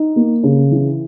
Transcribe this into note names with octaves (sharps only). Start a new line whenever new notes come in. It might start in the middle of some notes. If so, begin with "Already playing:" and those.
Already playing: D#4
A#3
C#3
E3